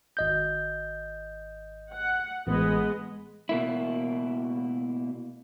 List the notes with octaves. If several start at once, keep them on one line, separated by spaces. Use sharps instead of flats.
G#1 D#5 G6
F#5
A1 G#3 B3 D#5
B2 A#3 E4